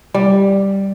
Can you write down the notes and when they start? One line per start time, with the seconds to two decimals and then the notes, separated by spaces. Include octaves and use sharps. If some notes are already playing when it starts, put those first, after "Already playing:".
0.14 G3